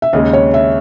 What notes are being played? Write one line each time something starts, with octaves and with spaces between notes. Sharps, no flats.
E5
D#2 C#3 G#3 D#5
C#5
E5